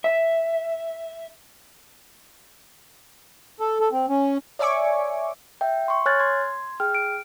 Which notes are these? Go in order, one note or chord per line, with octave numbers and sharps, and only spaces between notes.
E5
A4
A4
C4
C#4
C#5 D5 E5 G#5 C#6 D6
E5 G5
C6 C#6
C#5 G#5 F6 F#6 G#6 A6
C6 G#6
G#4 G5 F6
D7